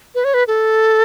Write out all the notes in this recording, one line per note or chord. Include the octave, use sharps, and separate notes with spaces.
B4
C#5
B4
A4